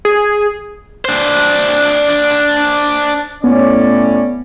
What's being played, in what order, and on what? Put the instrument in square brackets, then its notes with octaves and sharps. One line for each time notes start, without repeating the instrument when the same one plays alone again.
[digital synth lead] G#4
[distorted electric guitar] D4 C5
[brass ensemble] A2 C#4 D5 [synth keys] B3